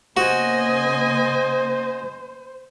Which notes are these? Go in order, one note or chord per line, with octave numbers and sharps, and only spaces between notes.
C#3 A#3 B3 F#4 C5 D#5 G#5